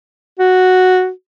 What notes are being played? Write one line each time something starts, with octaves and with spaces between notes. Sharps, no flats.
F#4